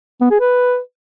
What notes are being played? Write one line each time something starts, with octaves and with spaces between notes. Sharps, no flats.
B3
G#4
B4